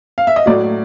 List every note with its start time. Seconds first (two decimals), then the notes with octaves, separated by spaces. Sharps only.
0.18 F5
0.27 E5
0.36 D#5
0.46 A2 F#3 D5